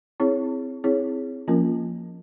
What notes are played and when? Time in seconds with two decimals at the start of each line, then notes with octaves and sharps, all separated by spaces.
0.20 C4 E4 G#4 C#5
0.84 C4 E4 G#4 C#5
1.48 F3 A#3 C#4 F4 A#4